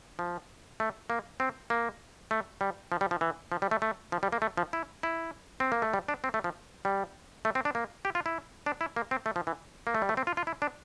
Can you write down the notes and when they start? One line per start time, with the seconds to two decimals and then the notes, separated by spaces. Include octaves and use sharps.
0.19 F3
0.80 A3
1.10 A#3
1.40 C4
1.70 A#3
2.31 A3
2.61 G3
2.92 F3
3.01 G3
3.11 F3
3.21 E3
3.52 F3
3.62 G3
3.71 A3
3.82 A3
4.12 F3
4.23 G3
4.32 A#3
4.42 A3
4.57 F3
4.73 E4
5.03 E4
5.60 C4
5.72 A#3
5.82 A3
5.94 G3
6.08 D4
6.24 C4
6.34 A3
6.44 F3
6.85 G3
7.45 A3
7.55 C4
7.65 D4
7.75 A#3
8.05 G4
8.15 F4
8.26 E4
8.66 D4
8.81 E4
8.96 A#3
9.11 C4
9.26 A3
9.36 F3
9.47 E3
9.87 A#3
9.95 A3
10.02 G3
10.09 A3
10.17 C4
10.27 F4
10.37 F4
10.47 E4
10.62 D4